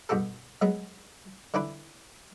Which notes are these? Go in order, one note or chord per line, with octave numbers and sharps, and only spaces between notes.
G2 B2 F#4 G4 A4
F#3 G#3 B3 G#4
D3 E3 D4 E4 B4